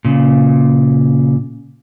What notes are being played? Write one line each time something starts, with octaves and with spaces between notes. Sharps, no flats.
A#2 C#3